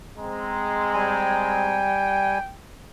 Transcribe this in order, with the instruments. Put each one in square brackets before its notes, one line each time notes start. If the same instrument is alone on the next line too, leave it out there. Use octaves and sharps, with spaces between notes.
[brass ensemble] G#3 C4 A#5
[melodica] G3 G#5 [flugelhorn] G5